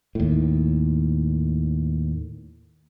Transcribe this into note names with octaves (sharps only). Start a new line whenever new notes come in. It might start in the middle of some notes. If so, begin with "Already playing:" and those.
D#2 A2